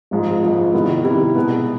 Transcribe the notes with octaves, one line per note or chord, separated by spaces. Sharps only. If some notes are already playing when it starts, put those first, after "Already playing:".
G#1 G#2 F3 G#3
G#1 G#2 F3 G#3
C3 D#3 G3 B3 E4
C3 D#3 G3 B3 E4
B2 G#3 B3